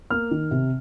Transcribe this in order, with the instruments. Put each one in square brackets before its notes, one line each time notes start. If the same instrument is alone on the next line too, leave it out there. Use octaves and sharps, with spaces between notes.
[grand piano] A#3 F6
D#3
C3